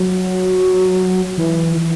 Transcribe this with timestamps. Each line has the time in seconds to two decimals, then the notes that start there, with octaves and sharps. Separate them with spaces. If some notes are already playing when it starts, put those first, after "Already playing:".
Already playing: F#3
1.38 E3
1.77 E3